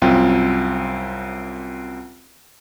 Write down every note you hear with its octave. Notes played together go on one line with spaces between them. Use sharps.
C2 F#2 C4 F4 G5